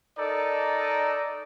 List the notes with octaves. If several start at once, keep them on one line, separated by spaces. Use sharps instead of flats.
D#4 A4 A#4 D5 D#5